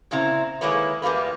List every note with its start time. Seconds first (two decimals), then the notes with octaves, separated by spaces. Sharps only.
0.11 A#2 C#3 C4 E4 A#5
0.61 D#3 G#3 A#3 E4 B4 C#5
1.02 E2 G3 A#3 F4 B4